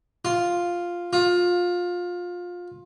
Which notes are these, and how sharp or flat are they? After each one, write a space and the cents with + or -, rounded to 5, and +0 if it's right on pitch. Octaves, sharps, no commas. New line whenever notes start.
F4 +0
F4 +20